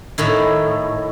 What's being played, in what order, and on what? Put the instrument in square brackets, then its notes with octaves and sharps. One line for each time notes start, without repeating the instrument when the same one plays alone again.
[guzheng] A2 D#3 E4